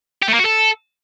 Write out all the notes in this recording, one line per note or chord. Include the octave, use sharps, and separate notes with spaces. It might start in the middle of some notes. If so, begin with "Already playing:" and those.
G4
A3
A#3
F#4
A4